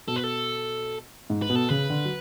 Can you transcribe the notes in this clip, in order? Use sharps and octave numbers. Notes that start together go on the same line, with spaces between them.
B2 A4
B4
A4
G#2
B4
B2
A4
C#3 B4
D3
F#3